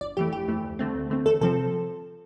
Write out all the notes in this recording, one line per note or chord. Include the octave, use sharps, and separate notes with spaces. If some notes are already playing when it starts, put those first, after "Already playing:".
G1 D5
F2 E3 A3 G4
G1 G4
F2 E3 A3
D2
D3 A3 C4
D2
D3 A3 C4
E2 A4
C3 F3 C4 A4